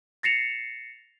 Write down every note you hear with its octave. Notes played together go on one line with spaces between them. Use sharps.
A6 A#6 C7 C#7 E7 F7